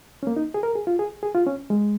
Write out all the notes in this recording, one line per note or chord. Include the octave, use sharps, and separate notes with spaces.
C#4
A#3
D#4
G#4
A#4
G#4
F4
G#4
G#4
F4
C#4
G#3